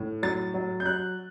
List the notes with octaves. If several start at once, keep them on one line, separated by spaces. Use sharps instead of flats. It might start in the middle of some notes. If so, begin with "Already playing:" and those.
Already playing: A2
F#3 A6
F#3
G6
F#3 F#6